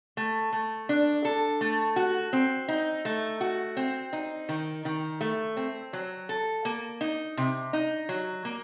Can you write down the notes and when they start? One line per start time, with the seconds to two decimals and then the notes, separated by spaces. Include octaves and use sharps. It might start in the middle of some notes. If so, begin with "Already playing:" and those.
0.17 A3
0.53 A3
0.89 D4
1.25 A4
1.61 A3
1.96 F#4
2.33 C4
2.68 D#4
3.05 A3
3.41 F#4
3.77 C4
4.13 D#4
4.49 D#3
4.85 D#3
5.21 A3
5.57 C4
5.93 F#3
6.29 A4
6.65 A#3
7.01 D#4
7.37 C3
7.73 D#4
8.09 F#3
8.45 A#3